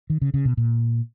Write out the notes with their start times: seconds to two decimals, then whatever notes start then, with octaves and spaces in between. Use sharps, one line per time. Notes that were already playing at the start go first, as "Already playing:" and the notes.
0.10 D#3
0.22 C#3
0.34 C#3
0.45 B2
0.57 A#2